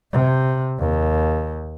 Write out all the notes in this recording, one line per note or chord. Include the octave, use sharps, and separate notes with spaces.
C3
D#2